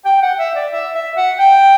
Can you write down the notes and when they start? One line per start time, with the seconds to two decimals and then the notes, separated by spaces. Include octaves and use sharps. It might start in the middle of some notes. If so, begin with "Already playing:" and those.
0.05 G5
0.22 F#5
0.39 E5
0.56 D5
0.72 E5
0.95 E5
1.17 F#5
1.38 G5